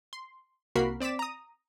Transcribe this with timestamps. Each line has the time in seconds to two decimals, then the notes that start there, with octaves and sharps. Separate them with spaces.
0.13 C6
0.75 C2 A#3 F#4 A#4 B5 C7
1.00 C4 D5 D6 B6 E7
1.19 A#5 D#6